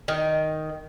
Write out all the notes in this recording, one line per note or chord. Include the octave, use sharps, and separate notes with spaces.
D#3